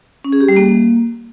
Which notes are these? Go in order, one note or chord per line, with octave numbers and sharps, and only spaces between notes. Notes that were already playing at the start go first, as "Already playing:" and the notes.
C#4
G#4
G4
G3
A#3